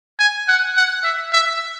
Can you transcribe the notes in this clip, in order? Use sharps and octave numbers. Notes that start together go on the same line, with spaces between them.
G#5
F#5
F#5
E5
E5